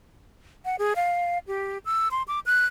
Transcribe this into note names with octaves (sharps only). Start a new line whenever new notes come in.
F#5
G#4
F5
G4
E6
C6
D6
F#6